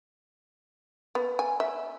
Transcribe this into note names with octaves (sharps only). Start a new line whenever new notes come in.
B3
G#5
E5